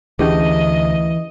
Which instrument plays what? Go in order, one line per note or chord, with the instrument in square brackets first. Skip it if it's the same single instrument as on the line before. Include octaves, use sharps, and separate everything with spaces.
[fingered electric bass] D2 D4 [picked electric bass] E3 [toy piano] C#4 G4 G#4 [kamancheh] D#5